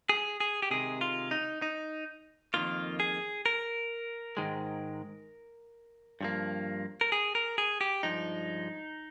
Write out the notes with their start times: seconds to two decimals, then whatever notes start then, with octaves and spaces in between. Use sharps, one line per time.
0.09 G#4
0.40 G#4
0.62 G4
0.71 C3 D#3 G#3 G#4
1.01 F4
1.31 D#4
1.62 D#4
2.54 F2 D#3 A#3 F4
3.00 G#4
3.46 A#4
4.37 G#2 D#3 G#3
6.21 G2 F3 A#3
7.01 A#4
7.12 G#4
7.35 A#4
7.58 G#4
7.81 G4
8.03 G2 F3 G#3 D#4